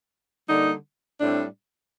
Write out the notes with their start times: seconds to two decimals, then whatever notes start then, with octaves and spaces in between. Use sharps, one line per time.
0.48 D3 G3 A#3 D#4
1.19 A2 G3 C4 D4